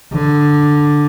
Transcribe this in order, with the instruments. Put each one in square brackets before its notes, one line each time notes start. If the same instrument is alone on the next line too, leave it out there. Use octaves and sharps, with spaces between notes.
[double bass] D3